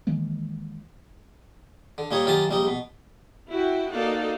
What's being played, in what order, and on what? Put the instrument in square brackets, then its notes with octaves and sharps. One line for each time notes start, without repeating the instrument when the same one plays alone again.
[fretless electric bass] D#3 E3 G#3 A#3
[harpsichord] D3
A#2 G3 D#4 C#5
F#2 D#3 F4 G4 A5 A#5
A#1 G3 D#4
B2
[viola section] E4 F#4 G5
A#3 D#4 F#4 A4 D5 F5